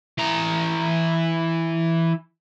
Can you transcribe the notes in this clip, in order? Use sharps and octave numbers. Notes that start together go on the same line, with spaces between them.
E3 A#5